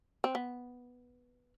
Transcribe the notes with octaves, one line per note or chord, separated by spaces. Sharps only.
C4
B3